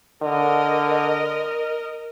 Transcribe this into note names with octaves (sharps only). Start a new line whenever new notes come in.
D3 A#4 D#5